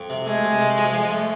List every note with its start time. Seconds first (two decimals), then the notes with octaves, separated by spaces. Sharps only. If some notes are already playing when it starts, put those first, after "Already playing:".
Already playing: F2
0.10 C3
0.26 G#3 A3
0.44 C3
0.61 A3
0.77 F3
0.93 F3
1.10 A3